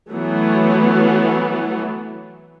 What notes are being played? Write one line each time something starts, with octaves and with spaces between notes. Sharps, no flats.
E3 F#3 A3 B3